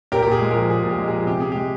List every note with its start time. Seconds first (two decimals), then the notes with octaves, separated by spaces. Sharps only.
0.12 A#2 G4 A#4
0.22 A#2 G4
0.32 G#4
0.41 G#3
0.51 F3 G4 A#4
0.69 A#2 G#4
0.84 A#2
0.89 G4
0.98 G#3
1.08 F3 G#4
1.27 C3 G4
1.40 C3 G#4
1.52 G#3 G4